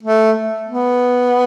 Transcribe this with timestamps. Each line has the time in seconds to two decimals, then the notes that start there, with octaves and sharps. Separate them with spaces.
0.03 A3
0.68 B3